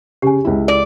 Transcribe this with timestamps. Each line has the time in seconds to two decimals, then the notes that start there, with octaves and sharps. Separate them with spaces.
0.22 C#3 G4 G#5
0.45 C#2 E4
0.68 D5